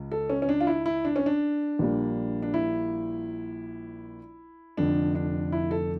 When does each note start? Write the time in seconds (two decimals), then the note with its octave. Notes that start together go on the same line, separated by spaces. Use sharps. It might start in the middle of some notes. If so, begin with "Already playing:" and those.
Already playing: C#2 C#3
0.12 A4
0.30 C#4
0.42 C#4
0.49 D4
0.60 F4
0.67 E4
0.86 E4
1.05 D4
1.16 C#4
1.26 D4
1.79 A#1 A#2 G3 A#3
2.42 D4
2.54 E4
4.77 F1 F2 D3 D4
5.15 D4
5.52 E4
5.71 A4